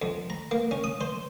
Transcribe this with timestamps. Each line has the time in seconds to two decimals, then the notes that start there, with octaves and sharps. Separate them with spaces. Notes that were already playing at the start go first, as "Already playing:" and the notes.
0.02 F2
0.30 A#5
0.51 A#3
0.71 C#4
0.84 D#6
1.01 C5